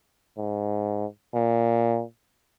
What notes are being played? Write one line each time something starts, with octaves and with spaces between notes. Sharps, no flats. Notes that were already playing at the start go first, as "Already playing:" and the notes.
G#2
A#2